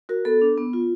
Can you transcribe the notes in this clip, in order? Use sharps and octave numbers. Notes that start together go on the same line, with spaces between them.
F#4 A#4
B3 A4
D4
B3
F4